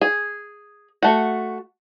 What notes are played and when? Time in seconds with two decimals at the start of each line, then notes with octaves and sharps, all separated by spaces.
0.01 G#4
1.03 A3 F#4